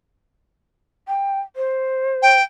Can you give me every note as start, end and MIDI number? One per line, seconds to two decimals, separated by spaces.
1.08 1.40 79
1.56 2.35 72
2.22 2.42 79